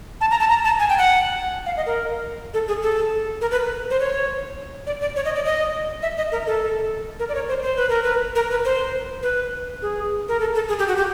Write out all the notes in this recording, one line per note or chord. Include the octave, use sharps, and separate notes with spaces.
A5
A#5
A5
A#5
A5
G#5
G5
F#5
F5
D#5
A#4
A4
G#4
A4
A#4
B4
C5
C#5
D5
D5
C#5
D#5
D5
D#5
E5
D#5
A#4
A4
A#4
D5
C#5
C5
C5
B4
A#4
B4
A#4
B4
C5
B4
G#4
A#4
A4
A4
G#4
G4
F#4
G4